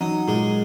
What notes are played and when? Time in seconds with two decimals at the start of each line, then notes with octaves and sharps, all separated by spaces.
0.01 F#3 D#4
0.27 A#2 G#3